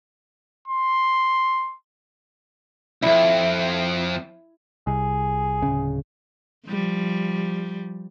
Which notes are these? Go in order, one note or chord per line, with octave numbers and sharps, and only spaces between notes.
C6
C2 F2 E4
C2 G#4
D1 C#3
F3 G3